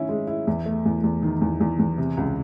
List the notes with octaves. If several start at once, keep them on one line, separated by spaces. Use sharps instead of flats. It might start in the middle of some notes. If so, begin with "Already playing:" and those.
Already playing: D#3 C#4 E4
G#3
E4
E2
A3
E2
E2
D#3
E2
E2
E2
C3
C#2